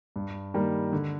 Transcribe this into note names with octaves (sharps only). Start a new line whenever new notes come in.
G2
D#3 G3 A#3
D3